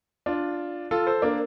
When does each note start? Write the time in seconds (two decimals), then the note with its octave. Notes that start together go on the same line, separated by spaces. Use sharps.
0.26 D4 F4
0.91 F4 A4
1.07 A4 C5
1.22 A#3 D4